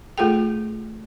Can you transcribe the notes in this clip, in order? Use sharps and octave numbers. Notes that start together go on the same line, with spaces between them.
A3 F4 G#4 A4 G5